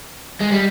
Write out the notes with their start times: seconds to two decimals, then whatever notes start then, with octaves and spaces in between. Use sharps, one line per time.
0.40 G#3
0.51 G3